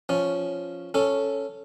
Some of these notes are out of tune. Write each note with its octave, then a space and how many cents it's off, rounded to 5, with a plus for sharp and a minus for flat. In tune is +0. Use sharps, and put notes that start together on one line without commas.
F3 +0 C#4 +0
C#4 +0 A4 +0